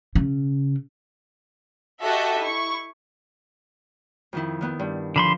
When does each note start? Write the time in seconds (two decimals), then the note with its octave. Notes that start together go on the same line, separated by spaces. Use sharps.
0.15 C#3
2.03 F#4 G4 A4 D#5 E5 F#5
2.39 E4 C#6
4.33 F2 D#3 E4
4.61 D#3 B3 E4
4.79 G2
5.16 D3 F3 B5 C6